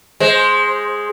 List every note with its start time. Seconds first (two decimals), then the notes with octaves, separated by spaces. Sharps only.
0.20 G#3 C5